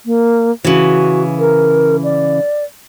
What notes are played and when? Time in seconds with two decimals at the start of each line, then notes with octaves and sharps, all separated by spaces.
0.05 A#3
0.64 C#3 E3 F#4
1.39 A#4
2.03 D5